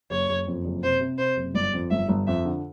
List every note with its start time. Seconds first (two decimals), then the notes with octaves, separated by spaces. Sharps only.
0.10 F#1 C#5
0.29 F#1
0.47 F2
0.65 F#1
0.83 C3 C5
1.01 C3
1.18 C3 C5
1.36 F#1
1.54 G1 D5
1.73 F2
1.90 G1 E5
2.09 G1
2.27 F2 E5
2.45 D3